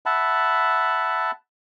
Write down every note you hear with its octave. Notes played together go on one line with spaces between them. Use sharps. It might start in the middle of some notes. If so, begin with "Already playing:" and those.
E5 F#5 A5 B5